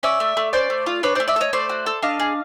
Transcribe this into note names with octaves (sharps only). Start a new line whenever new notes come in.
C#4 D5 E5
A3
A3
C#4 C5 D5
A3
F4
D4 B4 C#5
A3 C5 D5
D5 E5
A4
C#5 D#5
A3 C5 D5
F#4
A4
D4 D#5 F5
G#4